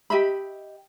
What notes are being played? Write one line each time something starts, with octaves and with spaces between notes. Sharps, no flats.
G4 D#5 E5 B5